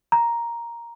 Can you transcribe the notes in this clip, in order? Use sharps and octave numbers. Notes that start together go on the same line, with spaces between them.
A#5